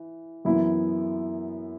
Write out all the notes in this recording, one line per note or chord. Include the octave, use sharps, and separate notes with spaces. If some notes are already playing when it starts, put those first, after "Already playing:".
Already playing: E3
F#2 E3 B3 E4